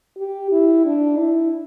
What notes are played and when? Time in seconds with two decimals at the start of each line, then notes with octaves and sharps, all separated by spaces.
0.17 G4
0.51 E4
0.85 D4
1.19 E4